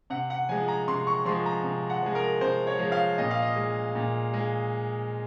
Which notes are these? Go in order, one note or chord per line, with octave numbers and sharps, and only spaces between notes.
C3 F#5
F#5
F3 G#3 G#5
A#5
C3 C6
C#6
F3 G#3 C6
A#5
C3
F#5
F3 G#3
A#4
C3 C5
C#5
F3 G#3
F5
A#2 D#5
F5
D#5
G#3
A#2
G#3